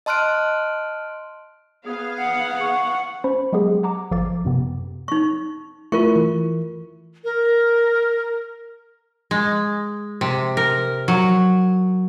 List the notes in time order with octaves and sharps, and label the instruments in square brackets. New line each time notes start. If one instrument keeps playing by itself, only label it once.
[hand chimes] D#5 A5 C6 F6 F#6 D7
[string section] B3 F5 [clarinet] G#4
[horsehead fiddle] F#5
[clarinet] C#6
[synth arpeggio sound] C#4 C5 B5 C#6
F#3 G#3 B3 G4 G#4
F#5 A5 A#5 D6
G#1 F3 A4 F5 D6 A6
F#2 C3 B3
[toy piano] D#4 C#6
[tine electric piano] A3 E4 [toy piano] F4 A#4 C#6
[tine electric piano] E3
[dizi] A#4
[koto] G#3
C3
A#4
F#3